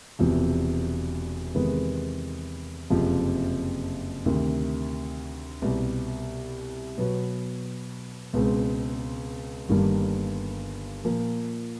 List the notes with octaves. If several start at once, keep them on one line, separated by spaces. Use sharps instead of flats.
E1 E2 C3 F3
E2 C3 D#3 G#3 B3
F#1 F2 C3 F3
D2 C3 D#3
C2 B2 G3
B2 F#3 B3
C#2 B2 G#3 C4
G1 G2 D#3 G3 A#3
A#2 F3 A#3